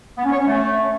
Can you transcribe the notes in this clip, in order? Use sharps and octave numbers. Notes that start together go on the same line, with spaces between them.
B3
C#4
C#5
C#4
A3